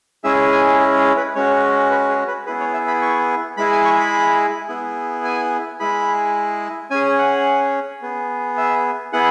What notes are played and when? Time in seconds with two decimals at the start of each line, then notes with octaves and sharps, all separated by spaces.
0.24 G#3 C#4 E4 G#4 E5
0.52 G#5
0.79 G#4
0.98 G#4
1.17 B4
1.35 G#3 C#4 F#4 C#5
1.91 B4
2.09 G#4
2.28 B4
2.46 B3 E4 G#4 B4
2.60 C#5
2.74 E5
2.88 B5
3.02 C#6
3.57 G#3 E4 G#4 B5
3.71 G#5
3.85 C#6
3.99 B5
4.68 B3 E4 G#4
5.25 G#5
5.80 G#3 E4 G#4 B5
6.91 C#4 G#5
6.95 G#4
7.19 F#5
8.02 B3 G#4
8.58 E5
9.13 B3 E4 G#4 F#5